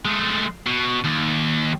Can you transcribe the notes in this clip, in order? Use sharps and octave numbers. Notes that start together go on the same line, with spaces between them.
G#3 A3
B2
D#2